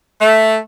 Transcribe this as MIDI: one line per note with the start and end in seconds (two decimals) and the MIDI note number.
0.21 0.57 57